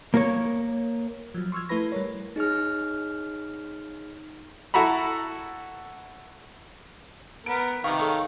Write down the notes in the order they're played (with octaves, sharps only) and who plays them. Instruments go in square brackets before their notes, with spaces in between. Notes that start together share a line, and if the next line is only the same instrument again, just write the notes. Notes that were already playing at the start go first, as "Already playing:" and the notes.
[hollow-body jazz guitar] A#3 A#4 C#5
[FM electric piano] F3 F#3
C6 C#6 E6 F6 G#6
A3 E4 A4 B4 B5 A#6
G3 A#4 C#5
[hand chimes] D#4 G#4 C#5 F6
[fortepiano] E4 F#4 A4 A#5 B5
[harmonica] B3 A#4 [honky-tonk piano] D7
[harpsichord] C3 B3 A#4 [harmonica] D#3 [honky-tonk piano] F5 C#6
[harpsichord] G#3 A4 C#5